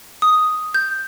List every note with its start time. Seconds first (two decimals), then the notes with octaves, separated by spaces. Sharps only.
0.22 D#6
0.74 G6